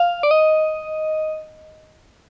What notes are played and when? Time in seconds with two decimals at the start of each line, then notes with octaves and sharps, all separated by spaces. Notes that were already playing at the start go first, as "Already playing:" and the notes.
Already playing: F5
0.23 D5
0.31 D#5